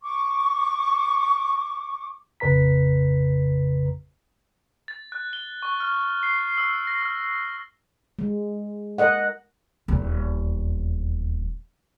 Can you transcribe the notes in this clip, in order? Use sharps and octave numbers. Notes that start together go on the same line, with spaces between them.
C#6 D6
A1 F2 C#3 B4 A#5 B6
A6
F#6
G7
C#6
F6
C7
E6
A#6
F6
G#3
A#4 D#5 F#5
D#1 E2